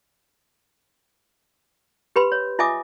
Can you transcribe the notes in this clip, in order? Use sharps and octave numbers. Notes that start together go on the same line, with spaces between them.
G4 B4 B5 C6
C#5
F4 D#5 E5 G#5 D6 D#6